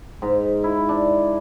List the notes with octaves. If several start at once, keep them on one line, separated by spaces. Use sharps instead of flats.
G#2
E4
D4